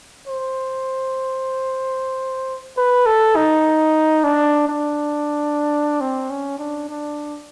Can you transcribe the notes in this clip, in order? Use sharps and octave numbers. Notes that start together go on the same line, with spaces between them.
C5
B4
A4
D#4
D4
D4
C4
C#4
D4
D4